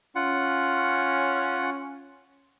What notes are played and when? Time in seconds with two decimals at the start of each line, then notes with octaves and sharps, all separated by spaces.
0.16 C#4 F4 F#5